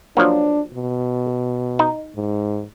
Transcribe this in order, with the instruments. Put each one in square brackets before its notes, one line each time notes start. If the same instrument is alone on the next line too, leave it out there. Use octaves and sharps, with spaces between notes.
[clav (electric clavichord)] F3 F#3 A#3 [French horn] D4
[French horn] B2
[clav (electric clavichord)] D#4
[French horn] G#2